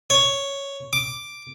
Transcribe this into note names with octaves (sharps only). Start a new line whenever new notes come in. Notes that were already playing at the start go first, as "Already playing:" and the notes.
C#5
D6